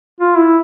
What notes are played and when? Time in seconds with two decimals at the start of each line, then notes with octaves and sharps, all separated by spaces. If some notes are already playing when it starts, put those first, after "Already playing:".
0.20 F4
0.38 E4